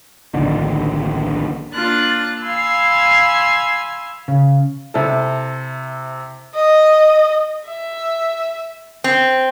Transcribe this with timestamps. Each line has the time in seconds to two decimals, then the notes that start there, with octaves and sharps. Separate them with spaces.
0.34 D1 A#1 D3 D#3
1.71 A#3 D4 F4 F#6 A6
2.42 F5 G#5 B5 C6 E6
4.28 C#3
4.94 C3 E4 A4
6.55 D#5
7.67 E5
9.04 C4